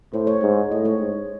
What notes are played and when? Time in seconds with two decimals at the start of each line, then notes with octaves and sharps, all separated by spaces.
0.13 A2 C5
0.27 C#5
0.42 G#2
0.71 A2 D#5
0.85 C#5
1.00 G#2